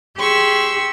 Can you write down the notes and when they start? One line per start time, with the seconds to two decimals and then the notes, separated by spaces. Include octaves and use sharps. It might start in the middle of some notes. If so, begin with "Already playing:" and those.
0.16 G4 G#4 C6 C#6 E6